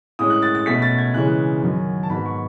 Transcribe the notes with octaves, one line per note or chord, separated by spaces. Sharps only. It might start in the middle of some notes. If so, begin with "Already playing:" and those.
A2 G#3 C#4 D#6
F#6
A6
A6
B2 A3 C#4 B6
A6
G#6
C#3 E3 G#3 C#4 F#6
F#2 D#3 F#3
A5
G#2 F#3 B3 B5
C#6